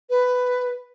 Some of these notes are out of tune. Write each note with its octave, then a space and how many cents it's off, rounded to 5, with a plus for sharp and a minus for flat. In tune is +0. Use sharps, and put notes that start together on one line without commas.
B4 +10